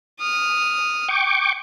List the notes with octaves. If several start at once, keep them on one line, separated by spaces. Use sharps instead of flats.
D#6 F6
G5 C#6 D6